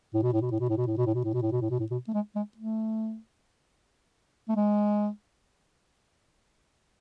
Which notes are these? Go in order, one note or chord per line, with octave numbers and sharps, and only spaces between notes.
A2
B2
A2
B2
A2
B2
A2
B2
A2
B2
A2
B2
A2
B2
A2
B2
A2
B2
A2
B2
A3
G#3
G#3
A3
A3
G#3